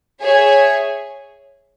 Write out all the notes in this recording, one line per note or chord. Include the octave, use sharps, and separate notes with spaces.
G#4 C#5 E5 G#5